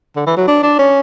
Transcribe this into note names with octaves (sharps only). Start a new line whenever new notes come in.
D3
E3
F#3
D4
D4
C#4